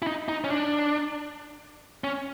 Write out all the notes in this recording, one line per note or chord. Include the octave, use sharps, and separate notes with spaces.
E4
D#4
D#4
C#4
D4
C#4